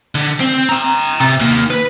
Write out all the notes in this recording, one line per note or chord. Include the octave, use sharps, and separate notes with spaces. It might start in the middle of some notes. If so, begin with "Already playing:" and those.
D3
C4
G5 A#5
C3
D#2 A#3
B4